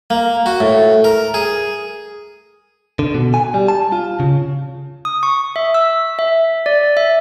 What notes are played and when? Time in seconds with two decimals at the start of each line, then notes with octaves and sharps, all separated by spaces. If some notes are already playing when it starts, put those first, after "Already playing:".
0.10 A#3
0.46 F#4
0.60 A2
1.04 A#4
1.34 G#4
2.99 D3
3.14 B2
3.34 G#5
3.54 G3
3.68 A5
3.92 F4
4.20 C#3
5.05 D#6
5.23 C#6
5.56 E5
5.74 E6
6.19 E5
6.66 D5
6.97 E5